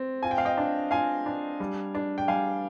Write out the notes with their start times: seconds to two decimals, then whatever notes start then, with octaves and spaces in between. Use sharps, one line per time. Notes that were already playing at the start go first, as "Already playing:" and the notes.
Already playing: C4
0.23 F4 G#5
0.31 G5
0.38 F5
0.45 D#5 G5
0.58 D4
0.91 F4 F5 G#5
1.26 D4
1.60 G3
1.95 D4
2.18 G5
2.28 G3 F5 G#5